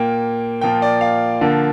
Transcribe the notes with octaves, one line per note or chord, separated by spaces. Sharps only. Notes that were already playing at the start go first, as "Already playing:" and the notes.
Already playing: A#2 A#3 G5
A#2 F3 A#3 G5
D5
F5
D3 F3 A#3